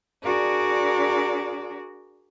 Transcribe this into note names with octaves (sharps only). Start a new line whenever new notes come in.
D4 F#4 G#4 A#4 D5